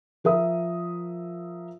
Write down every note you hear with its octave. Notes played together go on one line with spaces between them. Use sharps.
F3 A#4 E5 D#6